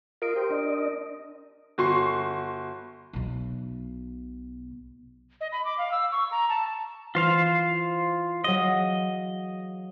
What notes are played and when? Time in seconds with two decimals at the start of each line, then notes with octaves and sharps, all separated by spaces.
0.22 F4 A#4 D#5 D7
0.36 G4 C5
0.50 D4 D#5
1.78 G1 F#4 C6 C#6 C7
3.13 B1 B2
5.41 D#5
5.52 B5
5.65 D6
5.78 F5
5.92 E6
6.12 C#6
6.32 A#5
6.49 A5
7.15 E3 F4 C5 F5
8.44 F#3 G#4 D#5 F5